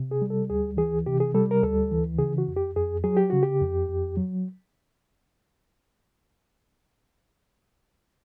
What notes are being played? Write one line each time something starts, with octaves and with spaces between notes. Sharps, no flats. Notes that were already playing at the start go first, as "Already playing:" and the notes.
Already playing: C3
G#4
G3
A4
D2 G#4
E3 G#4
C3 G4
G#4
G3 A4
A#4
D2 A4
E3
C#3 G#4
F#4
F2
G4
F2 G#4
F#3 G#4
G4
C#3 F#4
G4
F2
F2
F#3